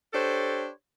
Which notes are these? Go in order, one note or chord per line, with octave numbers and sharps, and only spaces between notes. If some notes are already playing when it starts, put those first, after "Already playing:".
D4 G4 A4 C5 C#5